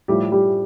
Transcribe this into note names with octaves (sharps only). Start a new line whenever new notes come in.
A2 F3 G3 G4
G3 G4